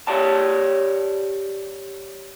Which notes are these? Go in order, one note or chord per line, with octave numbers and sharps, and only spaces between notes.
G4 C#5 D5 A5